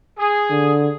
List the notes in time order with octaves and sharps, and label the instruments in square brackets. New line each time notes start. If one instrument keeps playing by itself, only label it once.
[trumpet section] G#4
[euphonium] D3